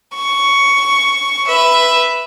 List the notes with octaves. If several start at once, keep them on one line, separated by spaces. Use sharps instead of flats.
C#6
B4 E5